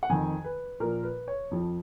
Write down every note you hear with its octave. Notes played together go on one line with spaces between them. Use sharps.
F#5
F2 D#3 G#5
B4
A#2 F3 A#4
B4
C#5
F2 F3